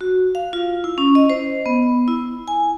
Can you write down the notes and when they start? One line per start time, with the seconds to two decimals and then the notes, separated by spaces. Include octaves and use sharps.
0.01 F#4
0.35 F5
0.53 F4
0.84 E4
0.98 C#4
1.15 D#5
1.30 C5
1.66 B3
2.08 E4
2.48 G#5